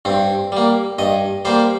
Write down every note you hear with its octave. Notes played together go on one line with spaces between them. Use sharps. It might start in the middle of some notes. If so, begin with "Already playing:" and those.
G2 C4
G3 A#3
G2 D#5
G3 A#3 C5